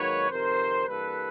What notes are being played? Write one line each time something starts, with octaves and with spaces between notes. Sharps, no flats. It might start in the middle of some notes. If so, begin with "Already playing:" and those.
Already playing: G#2 D#3 F#3 A#3 B4 C#5
F2 C3 D#3 A#4 C5
G2 E3 G3 A#3 A4 B4